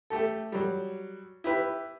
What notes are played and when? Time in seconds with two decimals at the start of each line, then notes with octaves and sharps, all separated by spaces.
0.10 A3 G4 A4
0.52 F#3 G3
1.44 E4 G4 B4